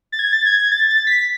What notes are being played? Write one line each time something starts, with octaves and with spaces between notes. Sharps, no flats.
A6
G#6
A6
G#6
G#6
A6
A6
B6